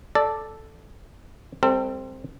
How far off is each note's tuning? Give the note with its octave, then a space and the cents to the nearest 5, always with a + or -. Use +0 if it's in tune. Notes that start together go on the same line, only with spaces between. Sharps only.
A4 -5 D5 +0
G3 +45 C4 +0 A4 +40